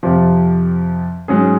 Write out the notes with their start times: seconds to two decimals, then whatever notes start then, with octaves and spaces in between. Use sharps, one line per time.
0.03 F2 C3 F3
1.28 G#2 F#3 C#4 G#4